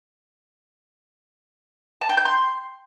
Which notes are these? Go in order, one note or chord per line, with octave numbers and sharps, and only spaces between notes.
A5
G5
G6
C6